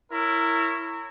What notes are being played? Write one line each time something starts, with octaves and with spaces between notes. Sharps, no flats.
E4 A#4 C#5